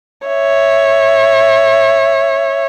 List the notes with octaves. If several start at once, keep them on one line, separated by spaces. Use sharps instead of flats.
C#5 E5